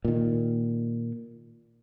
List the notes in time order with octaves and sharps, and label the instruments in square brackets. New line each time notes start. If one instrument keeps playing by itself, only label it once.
[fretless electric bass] A#2 D#3